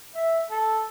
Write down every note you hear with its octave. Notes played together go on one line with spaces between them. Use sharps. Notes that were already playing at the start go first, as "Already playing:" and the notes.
E5
A4